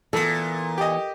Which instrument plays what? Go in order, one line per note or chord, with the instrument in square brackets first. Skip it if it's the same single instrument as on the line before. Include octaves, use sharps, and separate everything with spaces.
[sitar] A#2 [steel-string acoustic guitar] E3 B3 [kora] A4
[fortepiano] G4 D#5